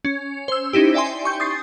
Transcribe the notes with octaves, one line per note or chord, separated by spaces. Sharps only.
C#4
C5 E6
C#4 D#4 E4 G4
D5 E5 G5 G#5 C6
C#6 G6
D#6 A6 C7